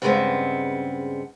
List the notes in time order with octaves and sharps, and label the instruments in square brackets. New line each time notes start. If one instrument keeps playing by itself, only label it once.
[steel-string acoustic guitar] G2 C#3 G3 G#3 B3 C4